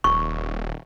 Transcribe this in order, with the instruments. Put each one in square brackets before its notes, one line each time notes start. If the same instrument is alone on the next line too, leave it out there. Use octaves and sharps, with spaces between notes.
[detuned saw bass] D#1 [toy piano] C#6